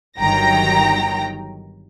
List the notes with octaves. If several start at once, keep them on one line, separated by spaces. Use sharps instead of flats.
G1 D#3 F#3 G5 A#5 A#6